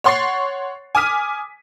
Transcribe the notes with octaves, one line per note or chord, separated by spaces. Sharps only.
C#5 F#5 C6 C#6 A6 C7
G#5 D6 D#6 F6 B6 D#7